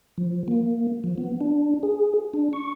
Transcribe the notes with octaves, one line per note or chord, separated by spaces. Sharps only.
F3
A#3
F3
B3
D4
G#4
D4
C#6